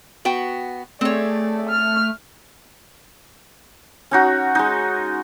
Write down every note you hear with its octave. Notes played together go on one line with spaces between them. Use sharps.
B3 F#4 G5
A3 C4 G#4 C#5 D5
F6
C#4 D#4 F#4
G#3 D#4